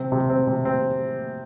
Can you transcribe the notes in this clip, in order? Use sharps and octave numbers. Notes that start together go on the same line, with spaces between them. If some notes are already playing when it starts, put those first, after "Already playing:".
Already playing: C3 C4
C3
C4
C3
C4